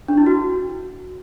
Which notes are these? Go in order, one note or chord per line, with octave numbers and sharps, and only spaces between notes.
D4
E4
F#4